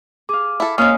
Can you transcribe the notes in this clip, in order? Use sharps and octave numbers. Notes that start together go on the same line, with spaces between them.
G#4 F5 D6
E4 A4
F2 G#3 A#3 C#4 C#5 F5 D#6 F6